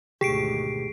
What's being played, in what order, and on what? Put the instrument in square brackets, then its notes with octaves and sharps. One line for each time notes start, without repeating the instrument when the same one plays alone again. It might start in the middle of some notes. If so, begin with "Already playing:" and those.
[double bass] G#1 D2 [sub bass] B2 [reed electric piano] G4 [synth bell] G#4 C7 D7